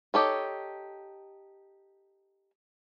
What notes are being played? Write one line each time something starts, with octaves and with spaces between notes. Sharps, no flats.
D#4 G4 A4 C#5